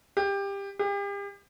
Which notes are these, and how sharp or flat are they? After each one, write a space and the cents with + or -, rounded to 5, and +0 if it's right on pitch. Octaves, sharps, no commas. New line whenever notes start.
G4 +20
G4 +40